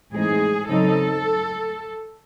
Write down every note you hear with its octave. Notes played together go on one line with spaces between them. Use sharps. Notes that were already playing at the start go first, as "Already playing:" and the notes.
A2 E3 G#3 C4 D#4 G#4
C#3 F#3 C4 D#4 A4